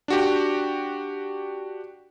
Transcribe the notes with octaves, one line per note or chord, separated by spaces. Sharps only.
D4 F#4 G4